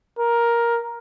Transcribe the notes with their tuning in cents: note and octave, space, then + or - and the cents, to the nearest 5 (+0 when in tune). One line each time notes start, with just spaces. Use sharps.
A#4 +10